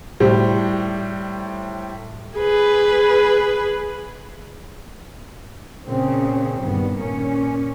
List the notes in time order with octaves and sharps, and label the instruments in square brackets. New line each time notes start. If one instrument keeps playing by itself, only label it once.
[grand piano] A2 G3 C5
[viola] G#4 B4
[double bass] A#2 C4 [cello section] C#3
[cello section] G2 [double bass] D#3 B3
[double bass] A#2 A#3 [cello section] C#4